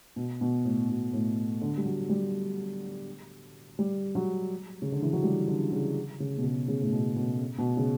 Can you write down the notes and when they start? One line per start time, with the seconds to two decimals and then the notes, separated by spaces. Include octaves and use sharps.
0.16 B2
0.41 B2
0.65 A2
0.89 B2
1.13 A2
1.61 D3
1.78 G3
1.86 F#3
2.09 G3
3.79 G3
4.15 F#3
4.82 C#3
4.92 D3
5.02 E3
5.13 F#3
5.23 G3
5.48 D3
5.72 C#3
6.20 C#3
6.38 B2
6.44 C#3
6.68 C#3
6.81 A2
6.92 B2
7.16 B2
7.58 B2
7.77 C#3